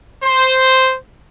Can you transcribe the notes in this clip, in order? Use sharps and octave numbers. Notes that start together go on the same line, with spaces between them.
C5